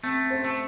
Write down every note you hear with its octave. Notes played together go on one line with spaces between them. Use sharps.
A3 C4
C5
A3